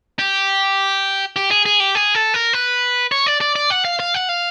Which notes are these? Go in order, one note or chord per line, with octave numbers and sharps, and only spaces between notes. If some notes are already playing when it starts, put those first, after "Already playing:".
G4
G4
G#4
G#4
G4
G#4
A4
A#4
B4
C#5
D5
D5
D5
F#5
F5
F5
F#5
F5